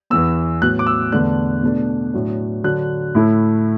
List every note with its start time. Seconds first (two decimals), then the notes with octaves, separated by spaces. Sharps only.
0.10 E2 E3 B3 E6
0.62 A2 F#3 B3 F#6
0.79 D6
0.87 E6
1.12 E2 D3 A3 D4 F#6
1.63 B2 A3 D4
2.13 A2 F#3 D4
2.64 D3 F#3 D4 F#6
3.15 A2 A3 E4